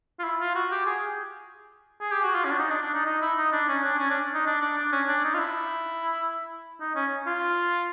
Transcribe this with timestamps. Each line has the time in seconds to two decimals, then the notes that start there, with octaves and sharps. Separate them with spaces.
0.19 F4
0.24 E4
0.40 F4
0.55 F#4
0.71 G4
0.86 G#4
2.01 G#4
2.12 G4
2.23 F#4
2.35 F4
2.44 C#4
2.51 D4
2.59 D#4
2.70 D4
2.82 D4
2.94 D#4
3.06 D#4
3.21 E4
3.37 D#4
3.52 D4
3.68 C#4
3.84 D4
3.98 C#4
4.10 D4
4.34 D#4
4.46 D4
4.61 D4
4.77 D4
4.92 C#4
5.08 D4
5.24 D#4
5.34 F4
5.39 E4
6.81 D#4
6.95 C#4
7.27 F4